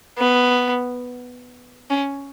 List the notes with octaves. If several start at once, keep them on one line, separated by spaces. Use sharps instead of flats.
B3
C#4